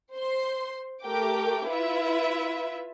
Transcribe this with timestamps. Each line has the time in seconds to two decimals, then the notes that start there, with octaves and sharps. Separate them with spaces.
0.14 C5 C6
1.04 A3 G4 A#4 G5 D6
1.69 E4 F4 B4 E5